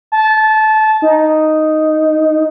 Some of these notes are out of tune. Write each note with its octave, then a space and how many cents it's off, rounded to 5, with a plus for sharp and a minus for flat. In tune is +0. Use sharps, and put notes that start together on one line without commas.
A5 -20
D#4 +0